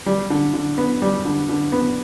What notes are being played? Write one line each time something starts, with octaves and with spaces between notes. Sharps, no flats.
G3
D3
D3
B3
G3
D3
D3
B3